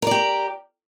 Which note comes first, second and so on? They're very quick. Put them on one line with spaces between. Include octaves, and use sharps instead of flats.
A#4 D5 G4